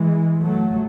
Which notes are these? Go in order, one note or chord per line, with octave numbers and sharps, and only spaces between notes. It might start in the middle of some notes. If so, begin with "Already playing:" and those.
Already playing: E3 G#3
F#3 A3